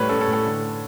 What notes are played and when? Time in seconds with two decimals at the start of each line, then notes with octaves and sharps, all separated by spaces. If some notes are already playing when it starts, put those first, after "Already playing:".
Already playing: A2 G3 B4 C#5
0.09 C#4 A4
0.21 A4
0.27 A2
0.33 A4
0.45 D3